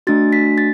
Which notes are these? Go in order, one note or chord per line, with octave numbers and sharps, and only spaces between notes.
A3 D4 F#4 A6
B6
A6